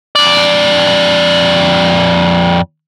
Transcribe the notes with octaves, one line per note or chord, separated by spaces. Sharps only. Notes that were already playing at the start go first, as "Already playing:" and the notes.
F2 D5